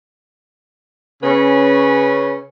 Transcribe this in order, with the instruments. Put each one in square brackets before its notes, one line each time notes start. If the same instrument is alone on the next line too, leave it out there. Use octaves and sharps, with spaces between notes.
[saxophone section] C#3 C#4 B4